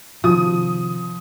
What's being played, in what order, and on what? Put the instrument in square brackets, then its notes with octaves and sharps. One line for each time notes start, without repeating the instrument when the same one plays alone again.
[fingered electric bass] C3 D#3 [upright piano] F3 [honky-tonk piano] D#6